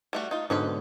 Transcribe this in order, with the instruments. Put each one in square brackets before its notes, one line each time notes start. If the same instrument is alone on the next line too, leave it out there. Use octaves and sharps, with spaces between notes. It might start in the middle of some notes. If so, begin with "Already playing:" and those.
[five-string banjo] G3 A3 F#4
D#4 F4
[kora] G#2 B2 D3 [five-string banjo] C#4 D#4 B4